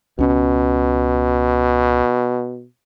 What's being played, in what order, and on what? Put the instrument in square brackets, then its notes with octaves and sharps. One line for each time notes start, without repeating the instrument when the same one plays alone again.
[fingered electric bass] C#2 C#4 [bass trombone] B2